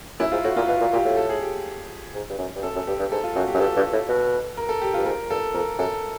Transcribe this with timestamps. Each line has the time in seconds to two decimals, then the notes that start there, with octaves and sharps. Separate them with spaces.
0.20 F#2 E4
0.31 G#2 F4
0.44 A2 F#4
0.56 A#2 F4
0.68 B2 F4
0.81 A#2
0.93 A#2 G4
1.05 A2
1.17 A4
1.29 G#4
1.41 G4
2.14 G#2
2.30 G2
2.39 F#2
2.56 G2
2.63 F#2 A4
2.75 F#2
2.87 G2 G4
3.00 G2
3.12 G#2 A4
3.23 F4
3.36 F#2 F#4
3.48 G4
3.54 F#2
3.60 G2 A4
3.76 G2
3.93 A2
4.09 B2
4.57 A#4
4.69 A4
4.82 G4
4.94 G2 F4
5.05 G#2 A#4
5.30 G2 A4
5.54 F2 A#4
5.79 F#2 A4